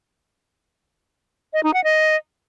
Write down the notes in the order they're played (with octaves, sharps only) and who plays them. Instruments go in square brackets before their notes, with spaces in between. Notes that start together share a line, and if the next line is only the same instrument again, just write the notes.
[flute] D#5
D#4
F#5
D#5